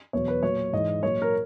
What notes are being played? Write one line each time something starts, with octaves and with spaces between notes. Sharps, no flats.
E2 B2 F#3 C#5
B4
A#2 F#3 C#5
G#2 E3 D#5
A#2 F#3 C#5
A#4